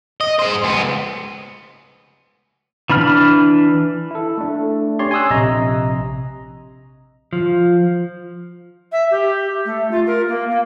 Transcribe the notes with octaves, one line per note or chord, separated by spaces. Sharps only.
D#5
G#4 C5
C#2 B3
E3 D4 B5 F6
E4 A4
A3 D4
C#4 G4 C#5 D5 C6
G#5 C6 C#6 D#6 E6 F#6
A#1 C3 D#5 A#5
F3
E5
G4
A3
F4
A#4
A#3
A#3